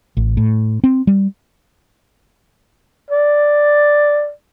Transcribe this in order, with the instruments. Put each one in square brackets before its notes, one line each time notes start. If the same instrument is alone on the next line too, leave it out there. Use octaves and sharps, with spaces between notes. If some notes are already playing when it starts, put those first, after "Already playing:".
[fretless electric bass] A1
A2
C4
G3
[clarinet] D5